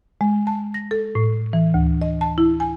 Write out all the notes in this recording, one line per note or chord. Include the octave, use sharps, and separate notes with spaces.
G#3
A5
A#6
A4
A2
E3
D2
D#5
A5
E4
G#5